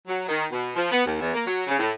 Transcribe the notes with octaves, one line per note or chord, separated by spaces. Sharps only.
F#3
D#3
B2
F3
B3
D#2
E2
A#3
F#3
C#3
A2